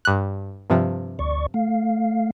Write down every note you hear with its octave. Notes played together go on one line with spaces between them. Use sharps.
G2 F#6
G2 C3 F3
D2 D5 C#6
A3 F5